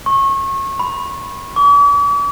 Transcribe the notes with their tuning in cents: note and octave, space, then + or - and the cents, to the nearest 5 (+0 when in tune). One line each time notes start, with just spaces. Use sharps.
C#6 -30
B5 +15
D6 -45